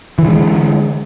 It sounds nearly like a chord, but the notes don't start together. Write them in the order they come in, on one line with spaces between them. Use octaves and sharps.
E3 D3 G#3